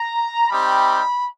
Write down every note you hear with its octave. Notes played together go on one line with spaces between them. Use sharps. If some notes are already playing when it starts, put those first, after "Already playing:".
Already playing: A#5
G3 C4 D#4 G4 B5